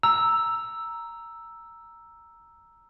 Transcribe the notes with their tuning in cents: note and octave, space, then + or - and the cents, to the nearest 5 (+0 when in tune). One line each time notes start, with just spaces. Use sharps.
A#5 +0 E6 +0